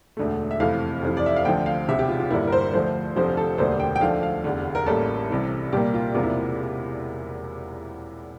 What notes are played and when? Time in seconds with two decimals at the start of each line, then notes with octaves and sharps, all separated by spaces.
0.17 E1 D2 D3 A3
0.51 E5
0.60 F2 C3 E3 A3 F5
1.02 F1 F2 E3
1.17 D5
1.26 E5
1.36 F5
1.45 D2 D3 F3 G5
1.66 F5
1.88 E1 E2 C3 E5
1.99 G4
2.09 F4
2.20 F4
2.30 G1 G2 D3 G3 A#3 E4
2.47 A#4
2.52 C5
2.74 D2 D3 F3 A3 C5
3.16 F1 F2 D3 F3 C5
3.37 A4
3.58 E1 D2 D3 G3 A#3 C5
3.80 G5
3.96 G5
4.01 D2 D3 F3 A3 F5
4.23 F5
4.44 F1 E2 D3
4.75 A#4
4.86 A1 A2 G3 A#3 A4
5.30 C2 C3 E3
5.72 C2 A#2 G3 A#3 G4
5.94 F4
6.15 E1 E2 C3 G3 A#3 F4
6.23 E4